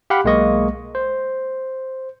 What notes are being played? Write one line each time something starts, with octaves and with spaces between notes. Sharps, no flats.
G4 F5 F#5 B5
B1 G#3 A#3 D#5 C#6
C5